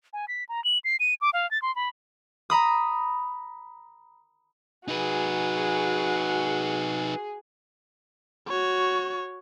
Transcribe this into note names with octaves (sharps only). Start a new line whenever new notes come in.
G#5
B6
A#5
F#7
C7
D#7
D6
F5
A6
C6
B5
A#5 B5 D#6
D#4 F#4 G#4 B4
F#4 C#5